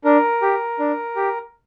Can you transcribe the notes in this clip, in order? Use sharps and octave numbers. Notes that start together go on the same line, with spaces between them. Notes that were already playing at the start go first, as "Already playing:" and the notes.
D4 A#4
G4
D4
G4